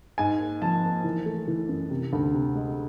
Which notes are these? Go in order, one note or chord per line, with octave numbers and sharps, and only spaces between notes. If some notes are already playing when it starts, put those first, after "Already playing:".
G#2 G#5
A#3
F3 A5
A#3
E3
A3
E3
F#2
C3
D2
C3
G#3